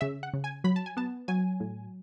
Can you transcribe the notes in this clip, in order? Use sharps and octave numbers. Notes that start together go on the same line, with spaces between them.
C#3 E5
F#5
C#3
G#5
F#3 B5
A5
G#5
B3 A5
F#3 G#5
A2